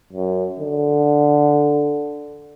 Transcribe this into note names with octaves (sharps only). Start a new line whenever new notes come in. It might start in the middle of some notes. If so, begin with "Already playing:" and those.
F#2
D3